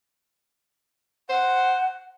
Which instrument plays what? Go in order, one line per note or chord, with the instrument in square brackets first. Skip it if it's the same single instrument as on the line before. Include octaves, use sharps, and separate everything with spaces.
[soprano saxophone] C5 [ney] F#5